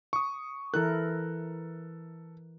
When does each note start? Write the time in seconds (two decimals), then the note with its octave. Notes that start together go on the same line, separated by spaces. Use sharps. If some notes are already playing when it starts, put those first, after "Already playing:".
0.13 C#6 D#6
0.74 E3 E4 A4 A#4 F#6